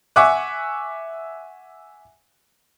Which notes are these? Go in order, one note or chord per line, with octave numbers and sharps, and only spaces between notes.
E5 F#5 G#5 C#6 D6 F#6